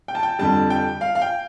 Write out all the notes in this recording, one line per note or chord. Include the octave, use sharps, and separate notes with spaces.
G5
A5
G5
F2 D3 G3 A5
G5
F5
F5
G5